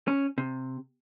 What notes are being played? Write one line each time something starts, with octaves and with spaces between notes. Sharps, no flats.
C#4
C3